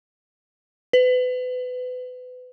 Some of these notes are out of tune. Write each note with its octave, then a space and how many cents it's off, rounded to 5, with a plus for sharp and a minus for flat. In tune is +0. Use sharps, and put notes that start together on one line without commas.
B4 +30